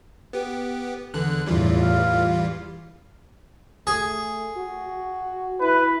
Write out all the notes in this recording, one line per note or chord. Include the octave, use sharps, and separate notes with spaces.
B3 G4
E2 D3 F#6
E2 A2 E3 G3 F4
F5
A3 G#4
F#4
E4 B4